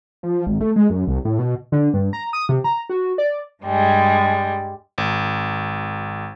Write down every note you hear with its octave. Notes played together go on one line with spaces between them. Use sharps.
F3
G#1
A3
G#3
F#2
C2
A2
B2
D3
G2
A#5
D#6
C3
A#5
F#4
D5
G2 G3 G#3
G#1